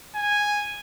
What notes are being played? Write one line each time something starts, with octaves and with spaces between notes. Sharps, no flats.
G#5